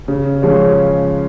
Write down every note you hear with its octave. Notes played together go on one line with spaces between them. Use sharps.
C#3
F3 G#3 C#4